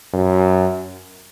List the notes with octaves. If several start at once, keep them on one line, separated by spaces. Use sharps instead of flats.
F#2